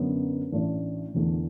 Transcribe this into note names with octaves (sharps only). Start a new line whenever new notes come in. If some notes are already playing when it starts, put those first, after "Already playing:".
Already playing: F#2 D3 B3
A1 A2 A3 D4
E1 E2 D3 A3